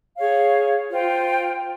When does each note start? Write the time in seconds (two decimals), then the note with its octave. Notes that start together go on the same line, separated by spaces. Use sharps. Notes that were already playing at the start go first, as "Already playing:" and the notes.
0.17 G#4 C#5 F5
0.90 F4 C5 G5